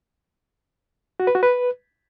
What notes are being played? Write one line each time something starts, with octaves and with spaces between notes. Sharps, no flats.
F#4
B4
F#4
B4